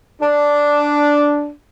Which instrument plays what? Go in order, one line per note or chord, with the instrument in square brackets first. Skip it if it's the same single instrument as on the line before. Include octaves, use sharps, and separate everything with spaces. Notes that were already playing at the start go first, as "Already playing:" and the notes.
[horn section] D4